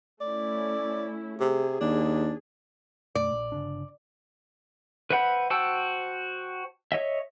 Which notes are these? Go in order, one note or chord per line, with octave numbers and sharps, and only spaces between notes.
A3 C#4 E4 D5
C3 G#4
D#2 D4
F#2 B2 A3 D5
A#1
G1 C#3 D4
B4 C5 E5 F#5 B5
F#4 C5 G5 A5 E6
C#5 D#5 E5